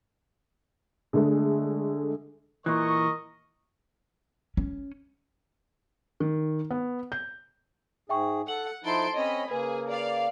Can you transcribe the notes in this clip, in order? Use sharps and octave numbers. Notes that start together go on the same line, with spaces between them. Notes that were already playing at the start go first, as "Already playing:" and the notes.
D3 G#3 A3
A#2 E3 A#4 D#5 C#6
C#4
D#3
B3
G6
G#2 G#4 E5 G5 C#6
A4 F#5 F#7
F3 D#4 E4 A4 C6 D7
C4 C#4 C#5 D#5 B5
C#3 A#3 G#4 B4
D5 F5